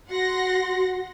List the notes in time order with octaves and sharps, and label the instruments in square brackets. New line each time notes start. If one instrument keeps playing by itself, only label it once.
[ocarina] F#4 [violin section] F#5 C6 A#6